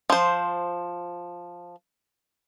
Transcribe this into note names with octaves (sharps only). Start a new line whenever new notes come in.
F3 C5